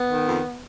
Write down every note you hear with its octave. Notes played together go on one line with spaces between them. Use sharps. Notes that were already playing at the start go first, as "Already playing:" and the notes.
Already playing: B3
D#3
F2